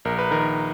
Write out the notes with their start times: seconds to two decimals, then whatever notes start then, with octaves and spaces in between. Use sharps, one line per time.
0.05 A#1 A#4
0.19 B4
0.31 D#3 A#4